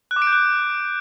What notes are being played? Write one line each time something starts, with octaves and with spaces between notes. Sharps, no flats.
F#6
D6
D7
G6
F#6